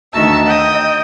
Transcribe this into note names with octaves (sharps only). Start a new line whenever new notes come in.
D2 D#3 F#4 E5 A5 E6
D#5 G5 D#6